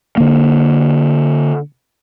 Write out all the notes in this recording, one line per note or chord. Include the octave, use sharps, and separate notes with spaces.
D3 A#3